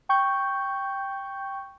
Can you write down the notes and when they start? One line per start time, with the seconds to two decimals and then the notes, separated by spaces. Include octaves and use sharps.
0.09 G5 C#6 G6